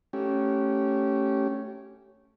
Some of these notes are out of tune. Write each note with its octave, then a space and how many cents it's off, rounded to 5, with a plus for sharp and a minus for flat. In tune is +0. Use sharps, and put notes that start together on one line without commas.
A3 +0 C#4 -5 G4 -20